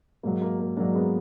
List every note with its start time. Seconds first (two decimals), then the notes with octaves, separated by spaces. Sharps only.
0.23 G#2 F#3 A#3
0.42 A#3
0.59 A#3
0.77 G#2 F#3 A#3 D4
0.94 G#3 B3